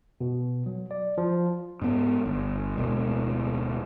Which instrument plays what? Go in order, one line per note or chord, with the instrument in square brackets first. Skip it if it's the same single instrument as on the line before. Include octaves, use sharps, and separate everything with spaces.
[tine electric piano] B2
F#3
D5
F3
[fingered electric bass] G#2 B3
G1
D1 B2 G#3